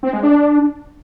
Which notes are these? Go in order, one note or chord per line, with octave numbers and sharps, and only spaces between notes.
C4
G#3
D4